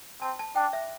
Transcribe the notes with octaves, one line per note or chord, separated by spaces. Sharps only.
C4 A5
A5
D4 G5
E5